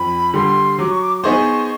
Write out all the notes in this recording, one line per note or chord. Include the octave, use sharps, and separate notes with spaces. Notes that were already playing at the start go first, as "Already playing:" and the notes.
Already playing: F2 B5
D3 G3 C6
F#3 D6
C#6
D6
D6
B3 D#4 G#4 C5 C#6